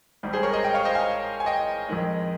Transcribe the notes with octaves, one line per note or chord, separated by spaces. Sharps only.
G#1 G#2 G3
G#4 C5
A#4 C#5
C5 D#5
D#5 G5
C#5 F5
C5 D#5
F5 G#5
G#5
D#5 G5
F2 D#3 G#3